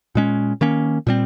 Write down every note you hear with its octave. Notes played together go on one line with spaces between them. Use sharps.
A#2 G#3 C#4
D#3 A#3 C#4
A#2 G3 C4